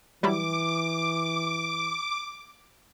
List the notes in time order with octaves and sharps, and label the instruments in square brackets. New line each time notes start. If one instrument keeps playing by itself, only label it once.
[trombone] E3 [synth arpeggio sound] F#3 G3 E4 [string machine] D6